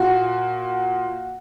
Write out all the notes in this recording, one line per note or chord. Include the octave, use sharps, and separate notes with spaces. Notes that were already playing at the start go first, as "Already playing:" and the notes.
Already playing: A#2 F#4